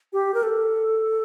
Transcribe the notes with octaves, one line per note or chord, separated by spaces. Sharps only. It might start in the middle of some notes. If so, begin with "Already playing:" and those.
G4
A#4
A4